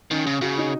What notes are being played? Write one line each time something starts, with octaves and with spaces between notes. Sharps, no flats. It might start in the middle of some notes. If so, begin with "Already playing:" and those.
D#3 C#4
C#3
C#3 F#4
D#4